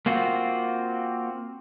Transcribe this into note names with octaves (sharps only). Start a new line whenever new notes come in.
A#3 C4 F4 F#4